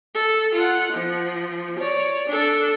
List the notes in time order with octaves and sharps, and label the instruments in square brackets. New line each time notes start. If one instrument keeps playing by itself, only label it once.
[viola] A4
F4 F#5
F3
C#5 D5
D4 A4